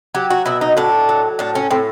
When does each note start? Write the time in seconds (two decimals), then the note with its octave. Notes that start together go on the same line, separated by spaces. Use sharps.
0.15 F#3 G4
0.30 F#4
0.46 B2 E4
0.61 D#4
0.77 A2 D4
1.09 F#3
1.39 A2 D4
1.55 C#4
1.71 A2 C4